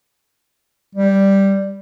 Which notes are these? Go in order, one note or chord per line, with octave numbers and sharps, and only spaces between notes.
G3